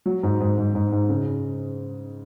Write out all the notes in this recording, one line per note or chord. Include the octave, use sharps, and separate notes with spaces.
F#3
G#2
G#2
G#2
G#2
G#2
C#3